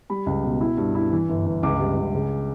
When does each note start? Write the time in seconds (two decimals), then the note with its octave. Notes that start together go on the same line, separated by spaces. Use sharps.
0.10 G3 B5
0.26 C#2
0.44 B2
0.61 E4
0.77 G2
0.95 E4
1.12 E3
1.29 G1
1.46 G1
1.63 C#2 D6
1.80 G3
1.97 C#2
2.14 C#3